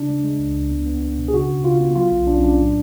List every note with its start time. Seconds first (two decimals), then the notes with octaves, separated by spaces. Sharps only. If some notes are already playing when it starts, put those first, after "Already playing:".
Already playing: C#3 D4
0.09 G#3
0.24 G#3
0.39 C#2
0.55 C#2
0.70 B3
0.86 B3
1.02 B3
1.18 B2
1.28 G#4
1.34 C#3 F#4
1.49 C#3
1.64 C#3 F4
1.80 B3
1.95 F#3 F4
2.12 B1
2.27 B1 D4
2.36 C#4
2.43 F#3 D4
2.59 A2